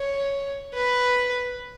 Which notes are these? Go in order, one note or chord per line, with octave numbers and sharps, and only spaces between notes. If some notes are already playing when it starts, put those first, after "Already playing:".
Already playing: C#5
B4